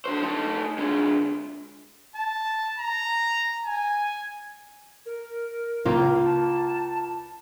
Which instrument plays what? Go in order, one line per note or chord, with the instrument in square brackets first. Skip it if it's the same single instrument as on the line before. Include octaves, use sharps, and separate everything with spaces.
[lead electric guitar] D3 C5
A3 D#4
D3 G#3
[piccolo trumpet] A5
A#5
G#5
[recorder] A#4
[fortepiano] C#2 A#3 [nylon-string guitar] F4
[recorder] A5